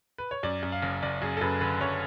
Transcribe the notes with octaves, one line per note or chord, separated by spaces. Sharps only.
B4
C#5
F#2 D5
F#2
F5
F#1
F#1 D5
F#2 G#4
A4
F#2 B4
D3 B4
F#2 C#5